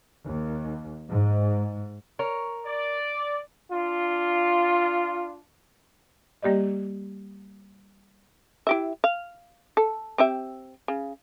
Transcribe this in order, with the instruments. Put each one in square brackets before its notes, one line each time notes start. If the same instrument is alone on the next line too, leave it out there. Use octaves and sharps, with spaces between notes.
[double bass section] D#2
G#2
[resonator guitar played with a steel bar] A#4 C#5
[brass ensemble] D5
[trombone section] D4 F4
[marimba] G3 A#3 G4 D5 D#5
[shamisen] E4 G4 E5
F5
A4
C4 G4 E5
C#3